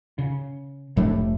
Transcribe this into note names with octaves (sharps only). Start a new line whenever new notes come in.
C#3
F1 F2 A2 G3 A3 D4